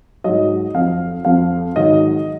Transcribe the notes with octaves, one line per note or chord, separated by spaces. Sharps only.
G#2 F#3 D#5
F2 F3 F5
F2 F3 F5
G#2 D#3 F#3 D#5